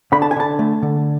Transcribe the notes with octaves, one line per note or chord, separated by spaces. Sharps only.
D3 B5
A5
G#5
D3 A5
A3
D3